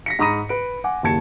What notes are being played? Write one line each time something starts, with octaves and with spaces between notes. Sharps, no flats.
A#6 B6 C#7
G#2 A#5 B5 D#6 A#6 D#7
B4 D7
F#5 G#5 D6
F#1 D#2 A5 G#6 C#7